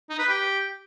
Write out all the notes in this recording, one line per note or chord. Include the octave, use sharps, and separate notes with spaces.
D#4
B4
G4